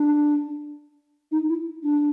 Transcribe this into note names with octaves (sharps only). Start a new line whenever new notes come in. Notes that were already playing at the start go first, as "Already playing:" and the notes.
Already playing: D4
D#4
E4
D4